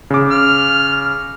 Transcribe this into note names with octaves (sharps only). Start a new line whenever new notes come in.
C#3 D6
F6